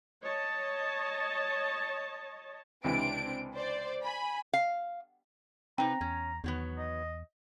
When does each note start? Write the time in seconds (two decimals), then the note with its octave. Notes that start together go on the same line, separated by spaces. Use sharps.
0.23 C#5 D#5 A5
2.84 C#2 C3 E3 C4 D4 D7
3.55 C5 D5
4.04 G#5 B5
4.53 F5
5.78 C3 C4 D#4 B4 G5 A#5
6.01 E2 C#4
6.44 E2 D#3 F#3 B3
6.78 D#5